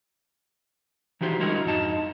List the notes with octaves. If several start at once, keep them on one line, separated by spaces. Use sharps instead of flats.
D#3 E3 F#4 G4 C5
D3 G3 G#3 E4 F#4 A#4
F2 G#2 D#4 A5